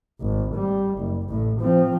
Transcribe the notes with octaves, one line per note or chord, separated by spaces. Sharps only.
G#1
G3
F#1
A1 A2
F3 C4